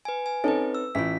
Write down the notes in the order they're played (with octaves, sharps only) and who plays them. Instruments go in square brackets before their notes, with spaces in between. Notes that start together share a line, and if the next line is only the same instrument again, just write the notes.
[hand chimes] B4 G#5
G#5
[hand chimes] C4 B4 [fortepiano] C#4 D#4 A4
[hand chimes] E6
[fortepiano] A1 [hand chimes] F4 B6